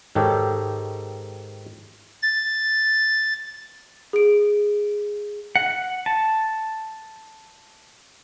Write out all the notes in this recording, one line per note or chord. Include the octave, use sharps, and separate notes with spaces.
G#2 D#3 D#4 G4 A4 C#5
A6
G#4 D7
F#5
A5